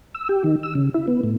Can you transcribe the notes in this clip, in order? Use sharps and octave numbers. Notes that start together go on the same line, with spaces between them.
E6
G4
D#3
E6
C#3
E4
B3
A2